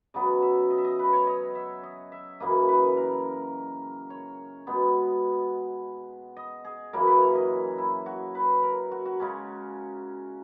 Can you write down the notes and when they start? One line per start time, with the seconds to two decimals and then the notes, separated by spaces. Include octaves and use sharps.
0.14 C#3 F#3 B3 D#5
0.42 E5
0.70 D#5
0.78 E5
0.85 D#5
0.99 B4
1.13 C#5
1.27 D#5
1.55 E5
1.83 D#5
2.12 E5
2.40 F#2 C#3 E3 A#3 D#5
2.68 B4
2.97 A#4
4.10 C#5
4.67 B2 G#3 B3
6.37 D#5
6.65 G#4
6.93 F#2 C#3 E3 A#3 A#4
7.07 B4
7.21 C#5
7.35 D#5
7.78 E4
8.06 F#4
8.35 B4
8.63 A#4
8.91 F#4
9.05 F#4
9.20 C#3 G#3 C#4